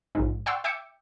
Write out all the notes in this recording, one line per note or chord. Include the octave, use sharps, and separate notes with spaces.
A#1 G#2
D5 F#5 G5 C6 C#6 E6
E5 G5 D6 E6 G6 C#7